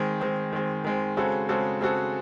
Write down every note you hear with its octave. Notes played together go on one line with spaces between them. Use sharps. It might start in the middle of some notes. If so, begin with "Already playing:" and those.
Already playing: D#3 G#3 C4
D#3 G#3 C4
D#3 G#3 C4
D#3 G#3 C4
C#3 G#3 C4 F#4 A4
C#3 G#3 C4 F#4 A4
C#3 G#3 C4 F#4 A4